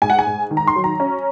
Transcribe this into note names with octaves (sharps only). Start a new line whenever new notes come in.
G#2 G#5
F#5
G#5
G#2
D#3
A#5
C6
F#3
A#5
C#4